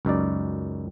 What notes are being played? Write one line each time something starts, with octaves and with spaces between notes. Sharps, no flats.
C#2 F#2 D#4 D5